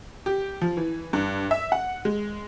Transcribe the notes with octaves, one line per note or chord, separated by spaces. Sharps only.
G4
F3
E3
G2
E5
F#5
G#3